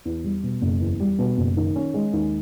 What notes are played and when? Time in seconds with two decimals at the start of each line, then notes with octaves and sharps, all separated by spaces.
0.05 E2
0.24 G3
0.43 B2
0.62 F#1
0.81 E2
1.00 G3
1.19 B2
1.37 F#1
1.57 D#3
1.76 C#4
1.94 G#3
2.13 D#2